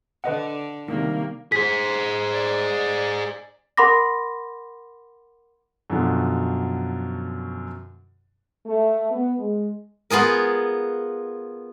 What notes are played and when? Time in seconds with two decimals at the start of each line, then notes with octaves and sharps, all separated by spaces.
0.24 D3 B4 D#5 F#5
0.88 C3 D#3 G3 A#3
1.52 G#4 C5 B6
2.34 D5
3.77 A#4 F#5 B5 C6 D6 A#6
5.90 F#2 B2 D3 F3
8.66 A3
9.11 B3
9.39 G#3
10.10 B3 F4 G#4 A#4